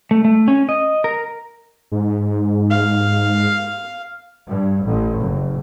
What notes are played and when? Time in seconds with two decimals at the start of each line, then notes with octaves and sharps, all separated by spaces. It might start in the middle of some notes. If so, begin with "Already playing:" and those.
0.11 A3
0.25 A3
0.48 C#4
0.69 D#5
1.04 A#4
1.92 G#2
2.70 F5
4.48 G2
4.84 A1
5.20 F#1